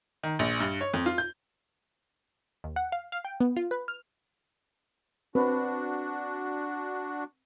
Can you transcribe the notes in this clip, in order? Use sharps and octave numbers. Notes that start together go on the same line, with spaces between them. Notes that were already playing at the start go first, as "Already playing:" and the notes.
D#3
A#1
G2
C#5
F2
F4
G6
D#2
F#5
F5
F5
G5
B3
F4
B4
F6
C4 D4 F#4 B4